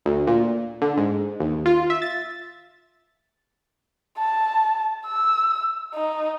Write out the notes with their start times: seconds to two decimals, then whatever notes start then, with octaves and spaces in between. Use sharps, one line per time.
0.06 D2
0.27 A#2
0.82 D3
0.97 G#2
1.40 D#2
1.66 F4
1.90 E5
2.02 A6
4.18 A5
5.07 E6
5.94 D#4